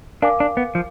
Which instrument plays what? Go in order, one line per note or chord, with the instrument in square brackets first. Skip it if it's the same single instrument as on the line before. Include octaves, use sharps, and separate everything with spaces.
[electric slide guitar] D4 [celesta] A#4 F5 G#5 D6
[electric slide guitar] D4
B3
F3